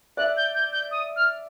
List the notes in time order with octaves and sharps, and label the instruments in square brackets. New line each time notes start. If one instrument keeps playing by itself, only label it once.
[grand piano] D5 E5 [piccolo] F#6
[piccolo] G6
G6
G6
D#6
F6